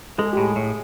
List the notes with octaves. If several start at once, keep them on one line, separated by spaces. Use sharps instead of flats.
G#3 A4
G#4
G4
A2 G#4
A2